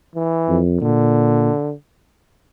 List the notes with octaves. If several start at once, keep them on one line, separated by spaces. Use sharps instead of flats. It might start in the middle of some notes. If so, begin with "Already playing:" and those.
E3
F2
A#2 D3